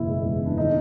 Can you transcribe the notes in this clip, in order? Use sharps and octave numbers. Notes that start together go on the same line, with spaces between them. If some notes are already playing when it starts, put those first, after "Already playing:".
Already playing: F#1 E2 B2 E4
G#3
E2
B2 D4
D#3 D#4